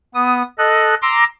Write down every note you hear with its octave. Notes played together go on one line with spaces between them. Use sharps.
B3 D#6
A4 D#5 F#6
A#5 C6 D6 E6 A#6